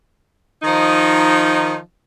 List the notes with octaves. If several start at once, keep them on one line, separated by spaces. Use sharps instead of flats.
D#3 F3 D#4